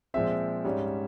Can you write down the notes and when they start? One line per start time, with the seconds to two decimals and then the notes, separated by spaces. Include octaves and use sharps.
0.14 A#2 F3 G#3 C4 E5
0.64 G#2 G3 C#4